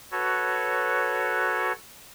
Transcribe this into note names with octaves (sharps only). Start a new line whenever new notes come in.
F#4 A4 B4 C#5